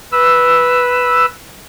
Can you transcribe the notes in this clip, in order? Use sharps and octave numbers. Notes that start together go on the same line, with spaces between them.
B4 E6